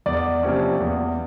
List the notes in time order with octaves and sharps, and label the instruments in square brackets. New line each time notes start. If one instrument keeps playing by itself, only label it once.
[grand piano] E2 [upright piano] D5
[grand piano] C3 F3 A#3 C#4
E2